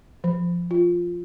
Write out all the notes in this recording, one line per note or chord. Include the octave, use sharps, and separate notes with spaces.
F3
F4